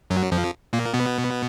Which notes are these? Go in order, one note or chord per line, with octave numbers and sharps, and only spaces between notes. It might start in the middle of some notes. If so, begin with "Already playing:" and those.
F#2 F#3
F2 F3
A#2 A#3
B2 B3